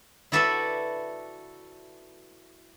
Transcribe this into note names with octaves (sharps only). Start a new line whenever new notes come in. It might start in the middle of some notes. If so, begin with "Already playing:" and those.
E4 F#4 A4 B4 D5 E5